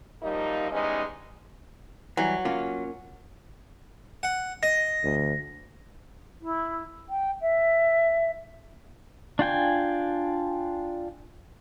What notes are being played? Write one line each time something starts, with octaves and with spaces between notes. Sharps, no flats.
F#2 D#3 F3 G3 A#3 D#4
E3 G3 G#3 B3 C#4 D#4
E3 F#3 G3
A#3 C#4 F4
F#5
D#5 A#6
D2
E4
G5
E5
D4 F4 G5 G#5